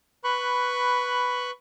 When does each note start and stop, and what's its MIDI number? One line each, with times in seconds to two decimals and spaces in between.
0.24 1.51 71
0.24 1.51 83
0.24 1.51 85
0.24 1.51 90